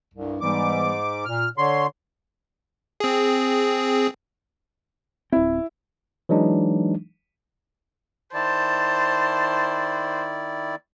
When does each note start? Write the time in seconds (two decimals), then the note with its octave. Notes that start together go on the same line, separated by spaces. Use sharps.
0.14 C2 G2
0.41 G#2 E3 G3 B3 D6
1.25 A#2 F6
1.58 D3 C#5 C6
3.00 C4 G#4
5.32 D1 C4 E4
6.29 E3 F#3 G#3 D4 D#4
8.34 D#3 E4 C5 D5 A5